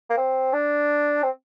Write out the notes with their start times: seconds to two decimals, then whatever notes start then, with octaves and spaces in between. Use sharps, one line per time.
0.10 A#3
0.17 C4
0.53 D4
1.22 C4